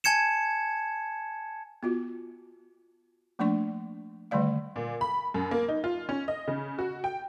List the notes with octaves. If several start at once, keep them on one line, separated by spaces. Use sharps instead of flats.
G#5 A5 G#6 C#7 E7
B3 F4 F#4
F3 A3 A#3 D4 D5 C#6
D3 D#3 G3 A3 D5 F5
A#2
B5
F#2
A#3
D#4
F4
C#4
D#5
C#3
F#4
G5